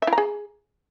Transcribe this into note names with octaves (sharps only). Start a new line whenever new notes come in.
E5
E4
A#5
G#4